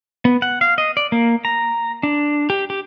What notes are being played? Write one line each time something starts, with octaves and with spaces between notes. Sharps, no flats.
B3
F#5
F5
D#5
D5
A#3
A#5
D4
G4
G4